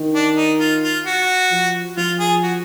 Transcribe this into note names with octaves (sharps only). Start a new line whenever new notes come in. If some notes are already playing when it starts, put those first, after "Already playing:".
Already playing: D#3
D4
D#4
F4
F4
F#4
F3
F3 F4
G#4
F#4